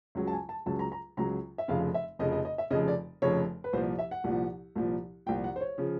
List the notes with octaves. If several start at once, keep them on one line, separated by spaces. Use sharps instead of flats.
C#2 C#3 F#3
A5
G#5
A5
C#2 C#3 F#3 A5
A#5
A#5
C#2 C#3 F#3 A#5
E5
F1 F2 C#3 F5
E5
F1 F2 C#3 D#5
D#5
D#5
E5
F1 F2 C#3 D#5
D5
F1 F2 C#3 C#5
B4
C2 A#2 F3 C5
E5
F#5
C2 A#2 F3
C2 A#2 F3
C2 A#2 F3 G5
F#5
C5
C#5
C#3 F3